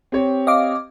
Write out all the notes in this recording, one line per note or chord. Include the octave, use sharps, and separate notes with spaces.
C4 G4 C#5
D#5 F5 D6